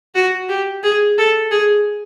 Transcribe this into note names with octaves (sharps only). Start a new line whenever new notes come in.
F#4
G4
G#4
A4
G#4